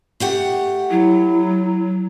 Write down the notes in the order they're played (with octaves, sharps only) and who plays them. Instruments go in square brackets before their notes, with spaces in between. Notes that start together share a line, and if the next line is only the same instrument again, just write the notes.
[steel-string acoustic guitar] A3 G4 F#5
[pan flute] F#3 [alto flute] E4